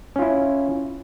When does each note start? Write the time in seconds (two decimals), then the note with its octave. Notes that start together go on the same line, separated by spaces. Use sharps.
0.16 C#4
0.19 F4
0.22 E4